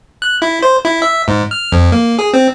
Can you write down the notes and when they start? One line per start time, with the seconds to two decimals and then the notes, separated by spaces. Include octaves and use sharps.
0.22 F#6
0.42 E4
0.63 C5
0.85 E4
1.02 E5
1.28 G#2
1.51 F6
1.72 F2
1.92 A#3
2.19 G#4
2.34 C4